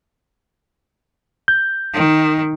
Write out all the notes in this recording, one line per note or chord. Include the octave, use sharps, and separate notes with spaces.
G6
D#3